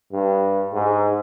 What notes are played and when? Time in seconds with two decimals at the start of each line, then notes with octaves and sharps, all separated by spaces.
0.12 G2
0.73 G#2